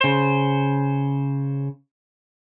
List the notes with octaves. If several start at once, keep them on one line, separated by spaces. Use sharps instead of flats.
C#3 C5